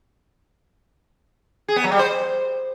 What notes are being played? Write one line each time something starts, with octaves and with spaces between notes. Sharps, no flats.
G#4
B3
F#3
G3
C5